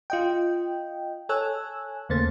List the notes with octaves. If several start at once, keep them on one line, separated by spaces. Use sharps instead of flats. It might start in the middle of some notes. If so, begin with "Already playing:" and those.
F4 D#5 G5
A4 C#5 G#5 E6 F#6
E2 C#3 A3 A#3 C5 A6